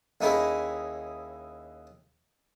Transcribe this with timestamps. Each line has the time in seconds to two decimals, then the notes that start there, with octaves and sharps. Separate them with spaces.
0.21 D#2 C#4 D#4 E4 G#4